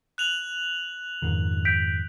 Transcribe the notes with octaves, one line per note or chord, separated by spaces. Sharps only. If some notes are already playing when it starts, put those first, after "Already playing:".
F#6 F7 F#7
F2 G#2 D#3
G6 B6 D7